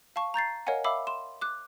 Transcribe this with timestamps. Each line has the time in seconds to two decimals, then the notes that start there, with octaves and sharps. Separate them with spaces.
0.16 F5 A5 C#6
0.34 A#5 G6 A6 C7
0.67 A#4 C#5 D#5 F5 F#5 G#5
0.84 E5 F5 B5 D6 E6
1.07 C6 E7
1.41 D6 F#6